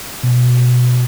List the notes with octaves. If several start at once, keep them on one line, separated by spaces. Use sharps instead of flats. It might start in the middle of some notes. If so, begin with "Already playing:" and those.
B2